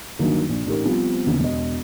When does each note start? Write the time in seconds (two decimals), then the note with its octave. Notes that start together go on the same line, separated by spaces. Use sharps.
0.19 G2 D#3 F#3 A#3 D#4
0.49 A#1
0.66 A1 D#4 G4 A#4
0.85 F3 G3 B3 C4
1.26 D#2 C#3 E3 B3
1.40 E1 D#5